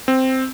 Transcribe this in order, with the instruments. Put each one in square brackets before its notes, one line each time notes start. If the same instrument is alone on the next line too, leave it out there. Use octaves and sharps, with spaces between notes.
[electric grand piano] C4